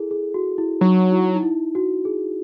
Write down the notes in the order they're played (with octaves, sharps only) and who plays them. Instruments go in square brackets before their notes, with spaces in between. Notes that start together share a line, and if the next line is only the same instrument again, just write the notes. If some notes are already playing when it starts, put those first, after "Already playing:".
Already playing: [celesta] E4 G#4 A4
G#4
F#4
E4
[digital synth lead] F#3 [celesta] D#4
[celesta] E4
D#4
E4
F#4
G#4